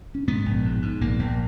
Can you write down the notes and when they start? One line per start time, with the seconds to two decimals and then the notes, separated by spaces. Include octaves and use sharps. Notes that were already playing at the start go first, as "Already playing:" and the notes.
0.15 C#4
0.27 G#2 B3
0.46 A#1
0.65 G#2
0.82 G#2
1.01 A#1 A#3
1.19 A#1